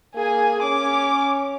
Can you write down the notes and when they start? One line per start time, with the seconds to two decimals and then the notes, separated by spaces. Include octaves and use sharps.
0.15 A#3 G#4 G#5
0.62 C#4 D6